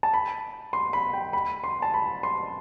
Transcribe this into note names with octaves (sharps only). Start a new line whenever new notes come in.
A5
B5
C6
B5
G5
B5
C6
A5
B5
C6